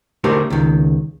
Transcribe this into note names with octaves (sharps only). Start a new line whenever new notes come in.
D3 A3 G4 A#4 C5
C#2 D#3